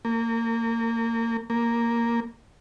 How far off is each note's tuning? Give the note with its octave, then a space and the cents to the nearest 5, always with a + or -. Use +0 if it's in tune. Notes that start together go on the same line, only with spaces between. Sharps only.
A#3 -25
A#3 +0